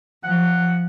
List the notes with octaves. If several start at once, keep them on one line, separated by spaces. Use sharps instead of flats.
F3 F#5